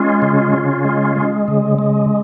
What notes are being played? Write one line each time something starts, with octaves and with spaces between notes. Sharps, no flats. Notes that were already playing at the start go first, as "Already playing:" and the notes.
Already playing: G#3 C#4 F4
C#3
C#3
G#3
G#3
C#3
G#3